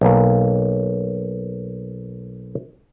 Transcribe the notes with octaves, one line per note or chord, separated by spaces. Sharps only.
B1 A#3